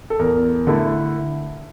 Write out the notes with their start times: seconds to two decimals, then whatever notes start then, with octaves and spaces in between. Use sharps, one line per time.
0.10 A4
0.19 E2 A#4
0.67 D3 A3 E4